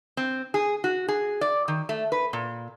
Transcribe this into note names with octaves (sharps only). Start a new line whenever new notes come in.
C4
G#4
F#4
G#4
D5
D#3
A3
B4
A#2